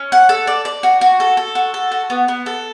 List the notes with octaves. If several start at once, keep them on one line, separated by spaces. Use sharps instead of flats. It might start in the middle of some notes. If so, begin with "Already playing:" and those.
Already playing: C#4
F#5
A4
D5
D5
F#4
F#4
A4
A4
F#4
A4
F#4
B3
B3
A4